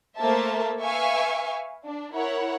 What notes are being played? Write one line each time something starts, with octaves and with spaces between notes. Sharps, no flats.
A3 A#3 A#4 C5 E5 A5
B4 E5 F5 G#5 C#6
D4
E4 A#4 C#5 F#5